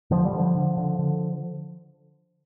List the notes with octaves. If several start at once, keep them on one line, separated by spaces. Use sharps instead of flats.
D3 F3
G3
D3
F3
D3
D3
D3